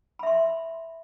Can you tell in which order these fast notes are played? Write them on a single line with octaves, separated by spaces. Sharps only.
B5 E5 C6